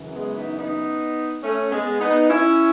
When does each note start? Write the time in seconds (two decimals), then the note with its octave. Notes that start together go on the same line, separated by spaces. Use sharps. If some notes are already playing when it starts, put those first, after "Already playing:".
Already playing: F#2 C#3 E3
0.15 G#3 B3
0.36 B3 D#4
0.57 B3 D#4
1.43 A3 C#4
1.71 G#3 B3
2.00 B3 D#4
2.29 C#4 E4